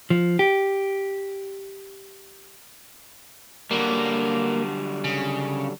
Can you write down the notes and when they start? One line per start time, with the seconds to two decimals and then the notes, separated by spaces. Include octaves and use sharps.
0.10 F3
0.39 G4
3.71 D3 F#3 G3 A#3
5.04 C#3